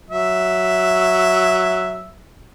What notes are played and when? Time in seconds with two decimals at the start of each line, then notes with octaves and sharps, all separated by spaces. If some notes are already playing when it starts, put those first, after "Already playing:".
0.10 F#3 E5